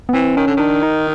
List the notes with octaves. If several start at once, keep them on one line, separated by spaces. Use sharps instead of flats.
B3
E3 C4
D#3 C#4
D3
D#3 D4
D#4